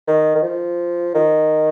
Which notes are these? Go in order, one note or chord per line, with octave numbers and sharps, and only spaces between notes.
D#3
D#3
F3
D#3